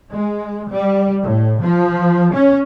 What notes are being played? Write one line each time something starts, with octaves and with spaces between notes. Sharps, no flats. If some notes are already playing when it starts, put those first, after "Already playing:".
G#3
G3
A2
F3
C#4